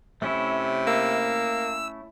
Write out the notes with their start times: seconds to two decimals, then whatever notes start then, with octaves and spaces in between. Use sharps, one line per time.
0.22 C3 A3 C#4 E4
0.87 A#3 E6